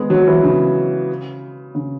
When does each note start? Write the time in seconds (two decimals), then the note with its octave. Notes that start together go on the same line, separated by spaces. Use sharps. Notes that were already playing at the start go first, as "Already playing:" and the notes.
Already playing: G#3 B3
0.10 F#3
0.27 E3
0.43 C#3
1.75 C#3